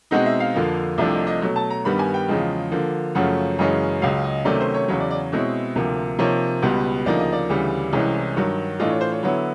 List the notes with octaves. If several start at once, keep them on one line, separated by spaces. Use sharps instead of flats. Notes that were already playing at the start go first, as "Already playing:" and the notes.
B2 G#3 C4 D#4 F#5
E5
F5
F2 D3 F3 A#3
C2 C3 F3 A3 D4 E5
D#5
D#5
B2 F#3 A3
A5
A#5
G2 D#3 G3 B3 B5
G#5
G5
E2 C#3 F3 G#3
D3 F3 A#3
F#2 C#3 F3 A3 C#4 F#5
F#2 C#3 E3 G#3 C#4
C#2 C#3 F#3 F5
D#5
C3 D#3 F#3 A3 C#4 D5
C5
C#5
E2 C#3 F#3 C#5
D5
D5
B2 G#3 C4 E4 C#5
D2 C3 F3 A#3
C3 F3 A#3 D#4 C#5
C#2 B2 G3 B3
D2 C#3 F3 A#3 D#4 D5
D#5
D5
D2 C#3 E3 G3
C2 C3 E3 G#3 C#4
G2 D#3 F#3
A2 E3 A3 D4 F4 D#5
C#5
C5
C#5
D3 F#3 B3 E4 C#5